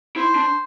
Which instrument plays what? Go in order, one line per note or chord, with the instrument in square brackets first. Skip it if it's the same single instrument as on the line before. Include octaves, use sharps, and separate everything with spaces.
[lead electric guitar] E4 [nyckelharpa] C5
[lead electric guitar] D4